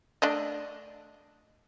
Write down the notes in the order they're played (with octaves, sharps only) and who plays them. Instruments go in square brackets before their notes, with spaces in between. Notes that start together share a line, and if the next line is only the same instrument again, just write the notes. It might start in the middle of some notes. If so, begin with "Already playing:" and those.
[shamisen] A3 D4 D#5